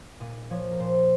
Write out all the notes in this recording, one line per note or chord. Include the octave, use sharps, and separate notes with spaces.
A#2 D#5
F3 C#5
A#4
A#2 C5